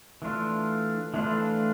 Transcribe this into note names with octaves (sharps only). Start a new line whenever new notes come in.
E3 A3 D4 F4
E3 A3 D4 F4